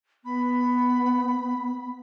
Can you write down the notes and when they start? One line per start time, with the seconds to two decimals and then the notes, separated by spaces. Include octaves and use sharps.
0.24 B3 B5